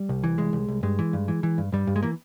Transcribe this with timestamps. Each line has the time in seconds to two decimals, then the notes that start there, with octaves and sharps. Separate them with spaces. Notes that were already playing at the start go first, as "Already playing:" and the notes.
Already playing: G3
0.09 C2
0.24 E3
0.38 C2 G#3
0.53 C2
0.68 C2
0.83 G2 G#3
0.99 E3
1.13 G2
1.28 E3
1.43 E3
1.58 G2
1.72 G2 G3
1.87 G2
1.96 G#3
2.03 E3 A#3